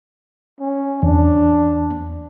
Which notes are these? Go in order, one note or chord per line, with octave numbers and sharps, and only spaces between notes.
C#4
E2 D4